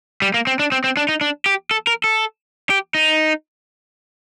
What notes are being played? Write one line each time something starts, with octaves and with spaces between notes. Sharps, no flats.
G3
A#3
C4
D4
C4
C4
D4
D#4
D4
G4
A4
A#4
A4
G4
D#4